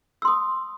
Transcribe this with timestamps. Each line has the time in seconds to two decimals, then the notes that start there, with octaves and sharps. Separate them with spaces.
0.22 E6
0.25 C6
0.28 D#6